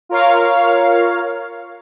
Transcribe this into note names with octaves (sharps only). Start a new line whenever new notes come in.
F4 A#4 C#5 F5